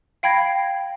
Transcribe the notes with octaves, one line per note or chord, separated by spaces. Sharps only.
F5 G5 B5 G#6 A#6 C7